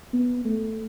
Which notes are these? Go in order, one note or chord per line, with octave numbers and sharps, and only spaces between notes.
B3
A3